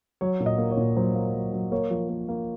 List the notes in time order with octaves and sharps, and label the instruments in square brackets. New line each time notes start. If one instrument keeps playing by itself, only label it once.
[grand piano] F#3 C#5
A#2
D#5
A#3
C#5
A#2
F#3 C5
A#3
F#3
F#3
A#3 C#5
F3
A#3
A#3